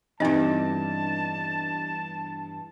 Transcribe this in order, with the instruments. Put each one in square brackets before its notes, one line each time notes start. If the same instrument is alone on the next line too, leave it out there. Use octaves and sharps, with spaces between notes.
[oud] E2 G2 [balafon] C4 D#4 [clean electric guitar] D4 G4 D#5 [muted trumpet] A5